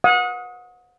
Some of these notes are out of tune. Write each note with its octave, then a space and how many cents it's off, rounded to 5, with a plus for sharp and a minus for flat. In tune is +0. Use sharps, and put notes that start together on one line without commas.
F#5 -30 D#6 +20